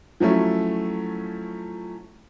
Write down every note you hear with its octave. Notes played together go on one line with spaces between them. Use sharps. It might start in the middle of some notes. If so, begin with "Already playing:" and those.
F3 F#3 A3 C#4 E4